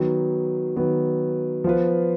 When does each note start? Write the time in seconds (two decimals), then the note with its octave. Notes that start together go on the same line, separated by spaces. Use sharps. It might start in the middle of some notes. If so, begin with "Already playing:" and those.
Already playing: D#3 F#3 B3
0.76 D#3 F#3 B3
1.64 F3 B3 F4 B4